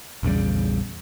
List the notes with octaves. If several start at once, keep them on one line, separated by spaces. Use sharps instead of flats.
A#1 E2 C#3 G3